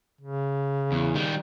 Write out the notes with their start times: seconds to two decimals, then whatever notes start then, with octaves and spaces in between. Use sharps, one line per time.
0.21 C#3
0.92 E2
1.15 D#3 G3